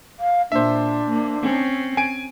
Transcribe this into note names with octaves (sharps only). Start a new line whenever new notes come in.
F5
A#2 D4 C5 E5
A#3
C4 C#4
G#5 D7